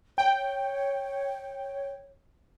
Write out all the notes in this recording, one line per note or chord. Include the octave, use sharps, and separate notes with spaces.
C#5 G5